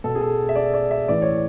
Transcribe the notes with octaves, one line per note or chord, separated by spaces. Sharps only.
B2 A4
G#4
A4
E5
D5
D5
E5
A2 E3 D5
C#5